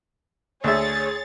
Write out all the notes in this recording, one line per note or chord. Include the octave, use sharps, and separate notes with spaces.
D2 G#4 C#5 E5 A6